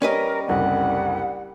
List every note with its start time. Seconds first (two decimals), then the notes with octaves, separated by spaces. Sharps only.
0.02 G3 C#4 A#4 B4 D#5
0.48 F#1 C2 D3 F#5